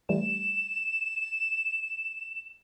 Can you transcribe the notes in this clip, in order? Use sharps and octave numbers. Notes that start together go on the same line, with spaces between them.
E3 G3 A3 E7